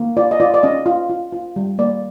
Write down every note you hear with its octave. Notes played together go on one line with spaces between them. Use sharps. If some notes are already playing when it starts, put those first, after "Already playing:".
Already playing: A#3
F4 D5
D#5
F4 D5
D5
C#4 D#5
F4
F4
F4
G3
A#3 D5